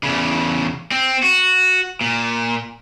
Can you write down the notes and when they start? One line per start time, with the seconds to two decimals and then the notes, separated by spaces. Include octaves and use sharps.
0.03 E2 C#3
0.91 C4
1.23 F#4
2.01 A#2